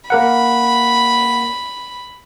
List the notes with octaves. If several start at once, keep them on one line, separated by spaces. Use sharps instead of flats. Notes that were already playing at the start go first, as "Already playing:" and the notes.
A#3 A#4 F#5 B5